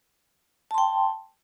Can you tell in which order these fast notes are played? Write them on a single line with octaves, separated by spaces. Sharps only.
A5 C6 G5